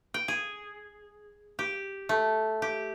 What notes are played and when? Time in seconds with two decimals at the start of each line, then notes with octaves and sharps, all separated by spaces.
0.14 G5
0.28 G#4
1.59 G4
2.09 A3
2.62 G4